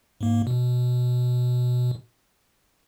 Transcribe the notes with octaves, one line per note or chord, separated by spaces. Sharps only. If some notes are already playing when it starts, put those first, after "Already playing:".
G#2 A#3
B2